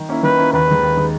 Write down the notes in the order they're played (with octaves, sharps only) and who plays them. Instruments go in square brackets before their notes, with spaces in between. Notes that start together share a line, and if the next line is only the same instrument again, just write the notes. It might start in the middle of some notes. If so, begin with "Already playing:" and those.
Already playing: [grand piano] D#3
A#3 C#4 E4
[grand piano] D#3 [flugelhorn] B4
[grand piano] A#3 C#4 E4
[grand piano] D#2 [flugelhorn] B4
[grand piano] D#3 G#3
D#2
D#3 G#3